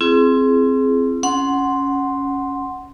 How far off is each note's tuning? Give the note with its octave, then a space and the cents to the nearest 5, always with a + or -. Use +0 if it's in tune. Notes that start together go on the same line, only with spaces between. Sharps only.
C4 +0 E4 +40 G#4 +20
C#4 +0 F#5 +0 C6 +0